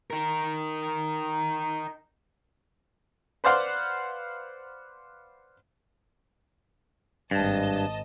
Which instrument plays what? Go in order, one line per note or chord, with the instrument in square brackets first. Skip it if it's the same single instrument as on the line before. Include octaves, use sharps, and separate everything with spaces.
[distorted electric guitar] D#4 A#4
[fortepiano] B4 C5 D5 F5 F#5 C6
[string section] G#1 D#5 A5 [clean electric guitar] G2